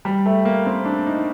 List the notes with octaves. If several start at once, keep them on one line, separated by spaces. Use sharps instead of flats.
G3
A3
A#3
C4
D4
D#4